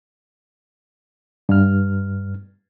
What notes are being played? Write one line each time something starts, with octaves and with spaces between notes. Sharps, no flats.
G2 F6